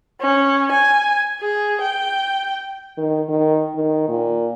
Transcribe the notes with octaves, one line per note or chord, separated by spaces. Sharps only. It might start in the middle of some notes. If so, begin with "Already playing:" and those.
C#4
G#5
G#4
G5
D#3
D#3
D#3
A#2